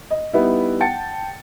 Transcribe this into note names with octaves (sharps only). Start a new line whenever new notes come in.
D#5
G3 B3 D#4 E4
F#5 G5 A5 A6 C#7